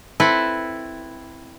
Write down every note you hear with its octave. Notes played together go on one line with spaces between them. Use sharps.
C4 E4 A4 B4